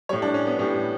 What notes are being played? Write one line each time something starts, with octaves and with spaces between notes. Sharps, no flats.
A2 G3 C#5
D4
C#4
B3
A2 G3 C#4